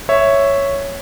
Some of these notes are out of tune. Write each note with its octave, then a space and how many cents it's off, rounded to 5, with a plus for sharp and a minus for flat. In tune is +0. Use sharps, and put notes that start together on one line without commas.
C#5 +0 E5 +0